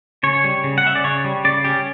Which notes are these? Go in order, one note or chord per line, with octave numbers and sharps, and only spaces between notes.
C#3 C#5
G3
C#3
F#5
C#4 E5
D5
C#3 C#5
G3
C#3 D5
C#4 G4